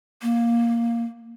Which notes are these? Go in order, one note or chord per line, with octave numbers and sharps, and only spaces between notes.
A#3